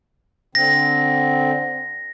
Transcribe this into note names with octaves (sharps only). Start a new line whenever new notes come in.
D3 C4 A#6